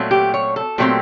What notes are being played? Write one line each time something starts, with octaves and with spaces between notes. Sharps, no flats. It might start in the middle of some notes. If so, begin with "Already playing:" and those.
Already playing: A#2 F#3 A3 C4
G4
C#5
A4
A#2 F#3 A3 C4 G4